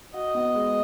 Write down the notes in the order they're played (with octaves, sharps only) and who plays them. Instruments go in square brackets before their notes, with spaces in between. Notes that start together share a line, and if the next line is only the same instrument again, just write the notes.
[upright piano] F#4 [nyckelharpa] D#5
[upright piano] B3
G#3